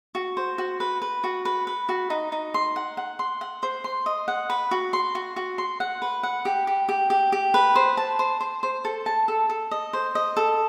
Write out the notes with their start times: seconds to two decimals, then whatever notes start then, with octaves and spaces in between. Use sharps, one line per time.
0.15 F#4
0.37 C5
0.58 F#4
0.80 B4
1.02 B4
1.24 F#4
1.45 B4
1.67 B4
1.89 F#4
2.10 D#4
2.32 D#4
2.54 C6
2.76 F#5
2.97 F#5
3.19 C6
3.41 F#5
3.63 C5
3.84 C6
4.06 D#5
4.28 F#5
4.50 B4
4.71 F#4
4.93 C6
5.15 F#4
5.36 F#4
5.58 C6
5.80 F#5
6.02 B4
6.23 F#5
6.45 G4
6.67 G4
6.89 G4
7.10 G4
7.32 G4
7.54 B4
7.75 C5
7.97 A5
8.19 C5
8.41 C5
8.63 C5
8.85 A4
9.06 A5
9.28 A4
9.50 A4
9.71 D#5
9.93 C5
10.15 D#5
10.37 A4